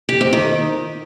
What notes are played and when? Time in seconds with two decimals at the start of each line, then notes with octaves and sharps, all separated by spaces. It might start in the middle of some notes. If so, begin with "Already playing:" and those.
0.09 G4
0.21 C4
0.33 D#3